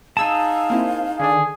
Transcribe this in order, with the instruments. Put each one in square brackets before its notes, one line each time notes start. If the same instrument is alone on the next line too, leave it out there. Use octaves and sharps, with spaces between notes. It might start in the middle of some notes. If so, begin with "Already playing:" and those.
[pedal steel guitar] D#4 G#4 A5 [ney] F5 [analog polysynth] D#6 E6
[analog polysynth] A#3 C4 E4
[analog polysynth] D3 D#3 D4 [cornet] G#4